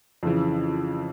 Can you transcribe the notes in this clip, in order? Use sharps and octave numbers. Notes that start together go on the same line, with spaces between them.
F2 C#3 E3